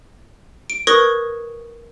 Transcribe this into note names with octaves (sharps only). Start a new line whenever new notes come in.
D7
A#4 B4 C#6 D#6 G#6 A#6